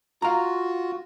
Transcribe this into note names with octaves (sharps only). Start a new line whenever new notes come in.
F4 F#4 F5 A#5